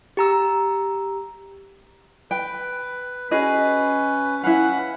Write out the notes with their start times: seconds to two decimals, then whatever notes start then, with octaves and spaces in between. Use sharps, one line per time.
0.17 G4 A#5 E6
2.31 B4 G5
3.31 C#4 F#4 G#4 B4 D#5
4.43 C#4 E4 B4 F5 F#5